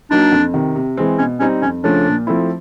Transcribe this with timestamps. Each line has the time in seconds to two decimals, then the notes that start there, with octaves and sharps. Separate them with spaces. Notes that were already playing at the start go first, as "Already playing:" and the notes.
0.11 F#3 A#3 D4 D#4
0.32 F2
0.54 C3 D#3
0.76 C3
0.97 E3 G#3 C4
1.18 B2 C#4
1.40 G3 C4 C#4 D#4
1.62 F2 C#4
1.84 C#3 F3 A3 C#4 D4
2.05 A#2
2.27 F3 A3 C4 E4